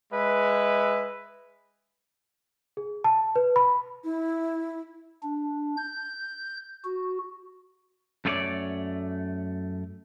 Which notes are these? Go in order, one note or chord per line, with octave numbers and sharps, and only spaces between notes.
G#3 B4 E5
G#4
A5
B4
B5
E4
D4
G6
F#4
F#2 A3 F4 G#4 C#5 D5